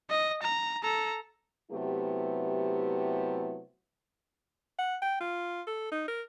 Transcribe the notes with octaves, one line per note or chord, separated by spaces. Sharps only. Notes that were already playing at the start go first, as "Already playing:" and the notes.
D#5
A#5
A4 A#5
C3 F#3 A3 B3 E4 G4
F#5
G5
F4
A4
D#4
A#4